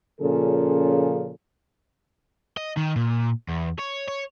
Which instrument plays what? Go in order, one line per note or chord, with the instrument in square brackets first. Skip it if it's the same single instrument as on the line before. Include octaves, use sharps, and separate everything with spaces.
[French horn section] A#2 C#3 F3 C#4 G#4 A4
[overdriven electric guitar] D#5
D#3
A#2
E2
C#5
C#5